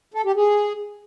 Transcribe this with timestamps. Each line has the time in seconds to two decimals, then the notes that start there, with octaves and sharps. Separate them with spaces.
0.14 A4
0.25 G4
0.36 G#4